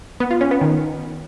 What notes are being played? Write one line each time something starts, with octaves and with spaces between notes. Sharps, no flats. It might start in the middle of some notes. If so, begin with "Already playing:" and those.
B3
F4
C#4
B3
D#3